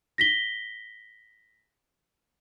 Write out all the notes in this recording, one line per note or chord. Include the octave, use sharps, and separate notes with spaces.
A#6 B6 G7